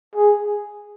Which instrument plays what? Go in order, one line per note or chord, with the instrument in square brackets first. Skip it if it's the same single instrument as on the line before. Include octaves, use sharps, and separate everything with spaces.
[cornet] G#4